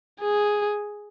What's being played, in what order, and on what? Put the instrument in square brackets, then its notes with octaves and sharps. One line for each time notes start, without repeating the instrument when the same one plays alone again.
[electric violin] G#4